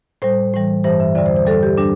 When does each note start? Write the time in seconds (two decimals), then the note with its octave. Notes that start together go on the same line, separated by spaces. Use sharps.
0.22 A2 G3 C5
0.54 A2 E3 G3
0.84 G2 E3 G3 C5
1.00 E5
1.15 E2 D3 G3 D5
1.26 C5
1.36 C5
1.47 G2 G3 A4
1.63 G4
1.78 G3 D4